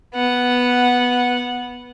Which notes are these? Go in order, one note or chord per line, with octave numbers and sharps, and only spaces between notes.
B3 F#5